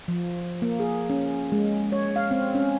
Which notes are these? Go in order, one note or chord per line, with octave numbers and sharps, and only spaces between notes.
F3
A#3
G#4
C#4
G#3
C#5
F5
C4
C#4